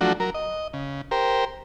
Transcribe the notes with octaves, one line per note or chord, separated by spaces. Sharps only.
F3 F#3 A3 D4 F#4
F#3 A#4
D#5
C#3
G4 A#4 C5